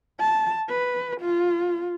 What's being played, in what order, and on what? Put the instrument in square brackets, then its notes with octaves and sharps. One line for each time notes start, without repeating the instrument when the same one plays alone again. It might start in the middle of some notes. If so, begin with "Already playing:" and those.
[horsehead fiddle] A5
B4
F4